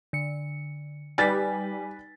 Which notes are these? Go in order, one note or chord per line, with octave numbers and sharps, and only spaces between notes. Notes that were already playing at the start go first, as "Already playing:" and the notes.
D3 C#7
G3 D#4 B4 G#5 A6 B6